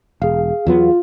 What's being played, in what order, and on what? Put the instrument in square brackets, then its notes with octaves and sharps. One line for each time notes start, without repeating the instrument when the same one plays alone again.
[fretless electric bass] E1 [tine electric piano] G#4 F5
[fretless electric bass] E2 F#3 B3 [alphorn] F4